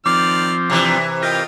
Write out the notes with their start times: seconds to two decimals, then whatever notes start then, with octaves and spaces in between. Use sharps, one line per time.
0.06 D#3 F3 C4 D5 D6 F6
0.70 C3 E3 D4
1.23 F4 G4 A#4 D#5 F5 G5